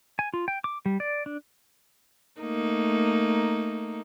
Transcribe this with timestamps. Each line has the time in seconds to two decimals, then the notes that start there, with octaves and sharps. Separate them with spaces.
0.19 G#5
0.34 F4
0.48 G5
0.64 D6
0.86 G3
1.00 D5
1.26 D4
2.41 A3 A#3 D#4